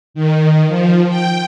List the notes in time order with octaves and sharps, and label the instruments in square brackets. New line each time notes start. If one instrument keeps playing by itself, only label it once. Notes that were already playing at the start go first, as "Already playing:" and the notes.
[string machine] D#3
F3
G5